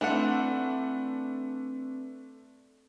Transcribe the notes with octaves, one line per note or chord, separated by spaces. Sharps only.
E3 A3 C4 D4 B4 F#5